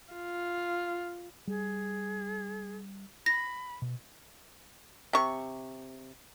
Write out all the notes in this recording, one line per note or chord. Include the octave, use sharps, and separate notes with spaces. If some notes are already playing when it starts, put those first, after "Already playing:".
F4
G3 G#4
B5 A#6
B2
C3 C#6